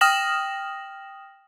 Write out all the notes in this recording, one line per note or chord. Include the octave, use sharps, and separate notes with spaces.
G5 D#6 F6 A#6 E7 F#7